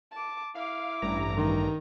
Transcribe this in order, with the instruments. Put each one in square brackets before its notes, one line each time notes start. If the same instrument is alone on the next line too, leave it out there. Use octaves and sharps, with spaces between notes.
[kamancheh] A5 D6
[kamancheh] E4 D6 [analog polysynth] F5
[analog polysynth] A1 G2 A#5
[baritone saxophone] D#3